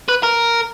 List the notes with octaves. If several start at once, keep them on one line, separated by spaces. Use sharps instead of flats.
B4
A#4